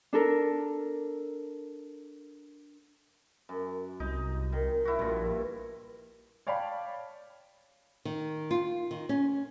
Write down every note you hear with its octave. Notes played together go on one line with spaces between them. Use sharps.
D4 A4 A#4
F#2
C2 D#4
D#3
E4 F#4
A#1 G2 A#2
C#5 D5 F5 G5 A5 B5
D#3
F4
D#3
C#4